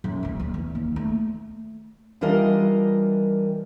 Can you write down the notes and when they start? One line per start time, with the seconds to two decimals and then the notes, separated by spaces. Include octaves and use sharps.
0.04 F#2
0.23 D2 G#3
0.40 D2
0.54 E2
0.75 D#2
0.96 A3
2.21 E3 G3 D4 F4 A#4 D#5